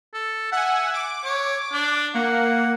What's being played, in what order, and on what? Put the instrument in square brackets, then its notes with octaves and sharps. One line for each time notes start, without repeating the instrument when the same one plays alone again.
[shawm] A4
[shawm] E5 [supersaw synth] F#5 G#5
[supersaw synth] D6
[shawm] C#5
D4
[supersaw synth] A#3 [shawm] F#5